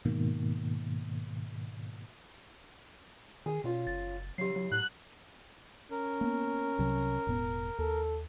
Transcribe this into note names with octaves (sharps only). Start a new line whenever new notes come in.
G#2 B2 D#3 A#3
D#3 G#4
B2 C#4 F4
F#1 A6
C#3 E3 F#3 G4 C7
F#3
A2 F#3 F#6
C#4 A#4
A#3 B3
C2 C3 F#3
E1 A2 B3
D#2 A4